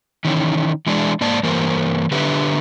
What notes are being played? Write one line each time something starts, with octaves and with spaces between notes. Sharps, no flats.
D#3 E3 C#4
E3 G#3 D4
G#2 A#3 D5 A5
G2 E3 A#3 A#4 C5
D3 D4 G4 B4 E5